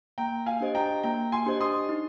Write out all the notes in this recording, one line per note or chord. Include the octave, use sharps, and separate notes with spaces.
A#3 G5 A#5
F5 G#5
D4 G4 C5 D#5
G5 A#5
A#3 G5 A#5
G#5 C6
D4 G4 C5 D#5
C6 D#6
D#4